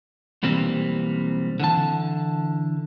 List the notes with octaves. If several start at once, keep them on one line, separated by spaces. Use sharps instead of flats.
B1 E3 G3 A#3 C4
D3 E3 A5